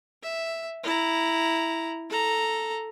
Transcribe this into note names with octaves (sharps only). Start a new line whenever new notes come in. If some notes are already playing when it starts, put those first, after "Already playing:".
E5
E4 A#5
A4 A#5